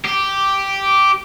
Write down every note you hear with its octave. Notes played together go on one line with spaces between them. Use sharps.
G4